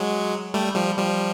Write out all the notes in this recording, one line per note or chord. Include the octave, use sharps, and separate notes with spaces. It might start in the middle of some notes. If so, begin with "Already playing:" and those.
Already playing: F#3 G#3
G3 A3
F3 G3
F3 G3